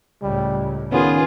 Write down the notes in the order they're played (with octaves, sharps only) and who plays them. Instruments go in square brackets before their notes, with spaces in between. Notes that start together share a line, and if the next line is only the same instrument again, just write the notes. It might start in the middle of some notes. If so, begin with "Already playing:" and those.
[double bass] C#2 A2 [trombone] G3
[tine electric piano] D#3 C#4 [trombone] B3 [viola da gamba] F4 G#4